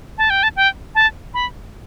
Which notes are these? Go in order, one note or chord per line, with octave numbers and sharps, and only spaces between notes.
A5
G5
A5
G5
A5
B5